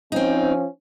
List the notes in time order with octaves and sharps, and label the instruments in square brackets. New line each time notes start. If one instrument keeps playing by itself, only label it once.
[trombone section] F3 C#4 [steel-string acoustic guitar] C4 D#4